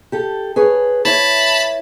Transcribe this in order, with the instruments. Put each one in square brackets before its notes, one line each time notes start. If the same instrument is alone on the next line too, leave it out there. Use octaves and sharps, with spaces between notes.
[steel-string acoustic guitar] G4 A4
G#4 B4 C#5
[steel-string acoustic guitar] E4 C#5 E5 [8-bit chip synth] A5 B5